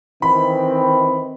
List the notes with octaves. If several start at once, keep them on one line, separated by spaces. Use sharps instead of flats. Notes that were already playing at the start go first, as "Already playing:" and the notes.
D#3 E3 C4 B5